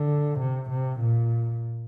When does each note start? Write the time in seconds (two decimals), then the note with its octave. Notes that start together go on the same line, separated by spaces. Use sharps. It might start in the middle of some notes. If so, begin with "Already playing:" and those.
Already playing: D3
0.39 C3
0.70 C3
1.00 A#2